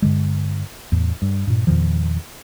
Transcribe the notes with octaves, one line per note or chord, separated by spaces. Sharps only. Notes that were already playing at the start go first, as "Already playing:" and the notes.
G2 D3 G#3
E2 A2
G2
G2 A#2
E2 A#2 D#3 F3